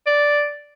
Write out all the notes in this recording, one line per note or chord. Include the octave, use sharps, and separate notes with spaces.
D5